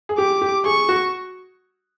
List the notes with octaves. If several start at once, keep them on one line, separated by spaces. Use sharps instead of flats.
G#4
G4 D6
G4
G#4 C#6
F#4